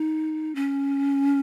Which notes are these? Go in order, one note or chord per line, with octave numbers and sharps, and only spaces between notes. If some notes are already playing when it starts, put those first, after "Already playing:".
Already playing: D#4
C#4